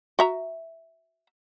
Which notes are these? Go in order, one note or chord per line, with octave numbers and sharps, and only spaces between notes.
F#4 E5 A#5